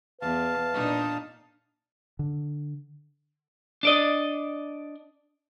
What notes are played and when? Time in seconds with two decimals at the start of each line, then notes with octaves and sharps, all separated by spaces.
0.21 E2 B4 F5 A5
0.73 A#2 D4 D#4
2.19 D3
3.83 D4 D5 D#5